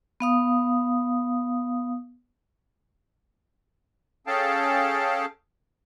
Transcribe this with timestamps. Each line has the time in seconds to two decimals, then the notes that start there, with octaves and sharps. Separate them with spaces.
0.20 B3 F5 D#6
4.27 C#4 G#4 A4 F5 G5 A5